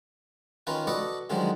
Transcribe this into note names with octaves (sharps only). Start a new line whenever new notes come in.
D#3 C#4 F4 A#4 B4
F#4 A4 B4 D5 D#5 F#5
D3 D#3 F3 F#3 G#3